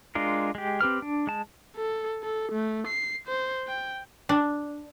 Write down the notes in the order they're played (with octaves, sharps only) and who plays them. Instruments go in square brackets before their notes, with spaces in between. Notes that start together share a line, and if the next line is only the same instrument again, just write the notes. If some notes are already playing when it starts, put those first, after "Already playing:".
[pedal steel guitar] G#3 D4 F4 A#4
G#3 G4
C4 G4 B4 F6
D4
G#3 A5
[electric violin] A4
A4
A3
C7
C5
G5
[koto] D4